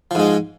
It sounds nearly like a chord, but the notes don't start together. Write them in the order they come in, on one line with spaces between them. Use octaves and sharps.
F3 G#2 G#3